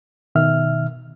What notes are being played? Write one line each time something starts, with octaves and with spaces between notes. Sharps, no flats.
B2 D#3 E5 F6